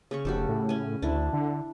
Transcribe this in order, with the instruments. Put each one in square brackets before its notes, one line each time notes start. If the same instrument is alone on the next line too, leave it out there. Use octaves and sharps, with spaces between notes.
[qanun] C#3 C#4 C#6
[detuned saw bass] F1 [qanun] F#4 G4 A4
[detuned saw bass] A2
[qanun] C#4 G#5
[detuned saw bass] D2 [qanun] D4 E4
[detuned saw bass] D3